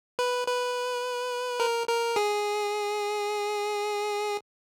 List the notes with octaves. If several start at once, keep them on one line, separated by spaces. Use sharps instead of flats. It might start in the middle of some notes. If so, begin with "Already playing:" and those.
B4
B4
A#4
A#4
G#4